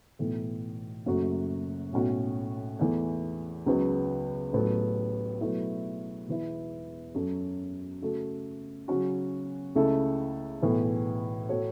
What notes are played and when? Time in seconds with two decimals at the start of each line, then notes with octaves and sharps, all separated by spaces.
0.19 B1 A2 E3 A3
1.06 F#1 F#2 F#3 A3 F#4
1.92 B1 A2 A3 C#4 F#4
2.79 E2 E3 A3
3.66 C#2 C#3 F#3 B3 F#4
4.53 A1 A2 F#3 B3 A4
5.41 B2 F#3 A3 E4 B4
6.27 E1 E2 E3 B3 E4
7.15 F#2 F#3 C#4 A4
8.02 C#3 A3 F#4 A4
8.88 C#3 F#3 C#4 F#4
9.75 C#2 C#3 A3 E4 A4
10.62 B1 A2 E3 B3
11.49 A2 A3 F#4 A4 C#5